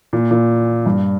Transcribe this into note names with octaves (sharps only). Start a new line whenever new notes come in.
A#2
A#2
G2